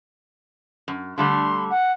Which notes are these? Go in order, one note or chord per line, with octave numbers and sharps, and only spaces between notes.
F#2
D3 G3 A3 C6
F#5